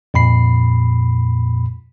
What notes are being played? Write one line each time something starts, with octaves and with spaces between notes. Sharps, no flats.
F2 A#2 B5 C7